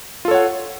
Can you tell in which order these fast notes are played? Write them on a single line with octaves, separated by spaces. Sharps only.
F4 A4 C#5 F#5